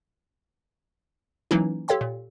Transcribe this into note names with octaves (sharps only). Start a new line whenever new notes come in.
E3 F#3 A#3 C#4 D#4 E4
G4 A4 C#5 F5 G5 C6
A#2